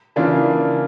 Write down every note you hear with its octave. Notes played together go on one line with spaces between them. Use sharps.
C#3 E3 A#3 D4 F4